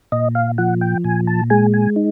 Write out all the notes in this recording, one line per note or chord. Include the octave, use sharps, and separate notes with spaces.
A#2 D#5
F5
F3 F#5
G5
A#2 G#5
A5
G#3 G#5
G#5
D#4